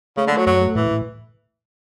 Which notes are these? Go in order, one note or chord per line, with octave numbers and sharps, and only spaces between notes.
C#3 A3
D3
F#3 A3
F#2 F#3
A3
A2 E3
A2